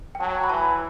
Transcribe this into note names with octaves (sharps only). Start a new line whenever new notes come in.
G5
F#3 A5
G5
B5
E3 A5